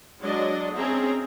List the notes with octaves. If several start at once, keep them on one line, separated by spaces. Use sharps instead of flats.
F#3 G#3 D4 D5 D#5
C4 C#4 G#4 E5 A#5